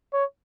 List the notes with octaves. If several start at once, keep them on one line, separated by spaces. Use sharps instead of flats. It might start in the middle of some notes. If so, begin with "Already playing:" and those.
C#5